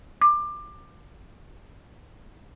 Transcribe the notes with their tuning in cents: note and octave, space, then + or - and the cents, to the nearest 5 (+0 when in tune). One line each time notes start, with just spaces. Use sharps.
D6 +20